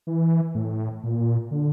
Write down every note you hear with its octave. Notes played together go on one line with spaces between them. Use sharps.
E3
A2
A#2
D3